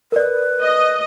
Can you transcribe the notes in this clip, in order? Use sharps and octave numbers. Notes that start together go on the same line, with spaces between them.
A#4 B4 D5
D#5